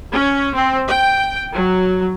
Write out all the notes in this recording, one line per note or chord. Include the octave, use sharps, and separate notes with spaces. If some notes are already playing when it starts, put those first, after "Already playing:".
C#4
C4
G5
F#3